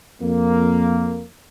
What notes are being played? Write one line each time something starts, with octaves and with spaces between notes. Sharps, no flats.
F2 A#3